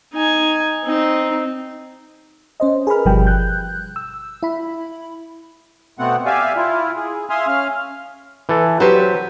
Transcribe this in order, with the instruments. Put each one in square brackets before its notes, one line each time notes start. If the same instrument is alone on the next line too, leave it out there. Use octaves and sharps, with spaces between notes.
[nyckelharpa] D#4 G#5
C4 D#4
[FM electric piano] C#4 C5 D#5
G#4 A#4 B4 B5 F6
G1 B2 F3 G3 G#4 G5
F#6 G6
E6
E4 B5
[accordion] B2 A3 B3 C4 F#5
G4 D5 E5 F5 G#5
E4 F4
G#4
E5 F5 G#5 C6 D#6 F6
C#4 F5 F6
[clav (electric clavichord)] E3 A4
[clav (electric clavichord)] F#3 C5 [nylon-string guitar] F#4 G4 B4